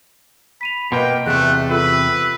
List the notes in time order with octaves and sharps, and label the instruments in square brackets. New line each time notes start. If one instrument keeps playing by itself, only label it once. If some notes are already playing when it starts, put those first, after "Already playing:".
[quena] B5 [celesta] B6 D#7 F7
[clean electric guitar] B2 A#3 [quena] B4 [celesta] D#5 C6 [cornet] G5
[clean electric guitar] E2 C3 [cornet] A3 [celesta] G#4 [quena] F#6
[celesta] F4 A4 [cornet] B4 [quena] E6